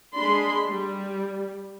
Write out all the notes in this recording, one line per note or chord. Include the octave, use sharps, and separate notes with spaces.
G#3 D4 B5 C6
G3